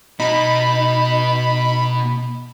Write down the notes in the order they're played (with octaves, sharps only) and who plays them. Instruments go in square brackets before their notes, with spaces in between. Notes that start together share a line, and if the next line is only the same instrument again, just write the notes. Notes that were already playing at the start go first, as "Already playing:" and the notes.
[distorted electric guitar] B2 [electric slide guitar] D#4 [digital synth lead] B5